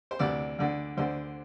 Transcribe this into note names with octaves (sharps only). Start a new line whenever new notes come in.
C5
D2 C3 E3 D5
D2 D3
D2 D3 C5